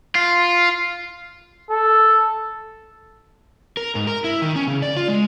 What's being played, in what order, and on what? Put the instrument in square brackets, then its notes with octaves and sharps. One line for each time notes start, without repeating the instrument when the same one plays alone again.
[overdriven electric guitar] F4
[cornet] A4
[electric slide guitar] A#4
G#2
A#4
E4
D#3
C#4
C#3
D5
F4
G#3